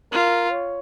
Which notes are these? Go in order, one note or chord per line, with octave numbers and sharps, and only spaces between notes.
F4 A#4
C#5